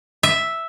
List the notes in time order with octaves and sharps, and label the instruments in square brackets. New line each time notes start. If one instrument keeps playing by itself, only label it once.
[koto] E5